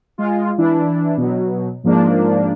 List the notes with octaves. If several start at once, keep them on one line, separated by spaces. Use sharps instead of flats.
G#3 F4
E3 D4 E4
B2 F#3
G#2 F3 A#3 D4